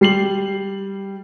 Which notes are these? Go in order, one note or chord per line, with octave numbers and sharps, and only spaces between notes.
G3 C7 F#7